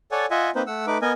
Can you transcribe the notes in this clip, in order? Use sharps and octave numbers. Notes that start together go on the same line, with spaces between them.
A4 C#5 D5 F#5 G#5
F4 D#5 E5 F#5 G#5
A#3 C4 D#4 B4 C5
A3 F#5 E6
A3 D#4 B4 D6
B3 A#4 D#5 G#5